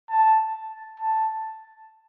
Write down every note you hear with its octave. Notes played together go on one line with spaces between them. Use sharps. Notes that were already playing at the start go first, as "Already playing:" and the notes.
A5
A5